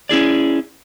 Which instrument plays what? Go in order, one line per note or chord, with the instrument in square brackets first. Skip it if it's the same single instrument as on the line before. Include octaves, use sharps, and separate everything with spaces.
[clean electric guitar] C#4 E4 G#4 D5